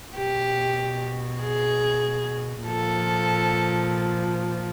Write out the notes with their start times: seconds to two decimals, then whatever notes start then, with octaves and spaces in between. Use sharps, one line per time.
0.16 B2 G4
1.41 G#4
2.66 A#2 F3 A4